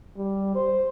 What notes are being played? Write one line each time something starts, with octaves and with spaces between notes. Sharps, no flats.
G3
C5